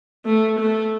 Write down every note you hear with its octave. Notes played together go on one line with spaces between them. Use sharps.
A3
A3